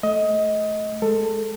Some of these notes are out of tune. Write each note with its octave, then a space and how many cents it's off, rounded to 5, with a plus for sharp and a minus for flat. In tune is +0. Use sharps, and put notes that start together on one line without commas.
A3 -15 D#5 +20
G#3 +15 A4 +20